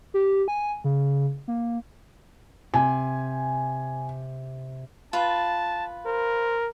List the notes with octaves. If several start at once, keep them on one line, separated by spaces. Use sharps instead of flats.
G4
G#5
C#3
A#3
C3 G#5
F4 B4 A5
A#4 C5